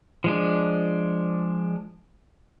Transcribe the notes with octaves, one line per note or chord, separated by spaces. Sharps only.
F3 G#3 D4